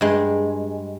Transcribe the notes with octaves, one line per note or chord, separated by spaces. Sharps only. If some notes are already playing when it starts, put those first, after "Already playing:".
G2 G#3